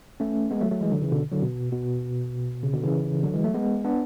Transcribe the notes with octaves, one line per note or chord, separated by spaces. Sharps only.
A3 C#4
G#3 B3
F#3 A3
F#3 A3
E3 G#3
D3 F#3
C#3 E3
B2 D3
D3 F#3
B2
B2
C#3
B2 D3
C#3 E3
D3 F#3
E3 G#3
F#3 A3
G#3 B3
B3 D4